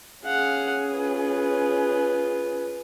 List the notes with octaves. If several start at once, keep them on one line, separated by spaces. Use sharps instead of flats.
C#4 G#4 F5 F#5
F4 B4